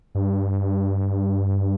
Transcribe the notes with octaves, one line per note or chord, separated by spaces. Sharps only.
G2